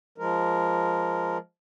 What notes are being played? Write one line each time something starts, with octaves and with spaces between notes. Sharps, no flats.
F3 G#3 A#4